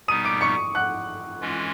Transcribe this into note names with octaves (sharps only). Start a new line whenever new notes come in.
B2 G3 B3 D#4 D#6 D#7
D6 D7
C#6 C#7
F#5 F#6
E3 G#3 C#4 F4